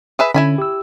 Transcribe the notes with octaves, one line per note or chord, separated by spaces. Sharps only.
G#4 B4 E5
D3 C#4 E4 G#5 B5
G4 E6